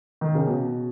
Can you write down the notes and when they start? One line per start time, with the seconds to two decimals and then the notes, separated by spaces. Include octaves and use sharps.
0.21 D#3
0.34 C#3
0.47 B2